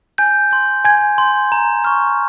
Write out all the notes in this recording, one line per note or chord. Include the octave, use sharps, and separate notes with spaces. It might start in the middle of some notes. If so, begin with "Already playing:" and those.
G#5 G6
C6 G6
G#5 G#6
C6 G6
A#5
C#6 F6